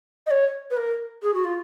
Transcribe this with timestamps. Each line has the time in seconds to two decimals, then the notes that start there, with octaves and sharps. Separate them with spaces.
0.26 D#5
0.30 C#5
0.70 B4
0.77 A#4
1.22 G#4
1.34 F#4
1.44 F4